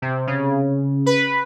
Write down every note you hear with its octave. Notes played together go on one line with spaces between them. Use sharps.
C3
C#3
B4